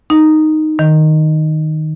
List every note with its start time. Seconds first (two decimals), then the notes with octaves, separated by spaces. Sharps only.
0.10 D#4
0.79 D#3